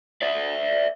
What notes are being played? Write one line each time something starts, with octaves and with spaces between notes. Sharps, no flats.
D5 E5